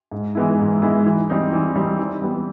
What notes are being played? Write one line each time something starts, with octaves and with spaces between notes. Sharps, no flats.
G#2
E3 G#3 B3 E4
G#2
E3 G#3 B3 E4
E3
G3 C4 D#4
E3
G3 C4 D#4
E3
G3 B3